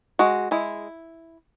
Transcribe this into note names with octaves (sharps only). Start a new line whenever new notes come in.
G#3 F#4
G#3 E4